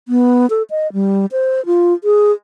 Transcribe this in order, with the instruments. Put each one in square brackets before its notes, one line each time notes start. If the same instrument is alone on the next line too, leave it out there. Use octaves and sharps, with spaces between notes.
[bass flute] B3
A4
D#5
G3
C5
F4
G#4